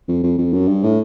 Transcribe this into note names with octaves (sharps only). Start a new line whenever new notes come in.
F2
F2
F2
F#2
G2
A2